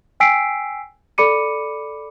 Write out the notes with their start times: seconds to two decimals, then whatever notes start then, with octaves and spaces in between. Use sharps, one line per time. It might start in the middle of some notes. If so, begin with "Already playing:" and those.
0.20 G5 G#5 E6 B6 C7 D7
1.18 A4 D5 B5 D6 C#7 D#7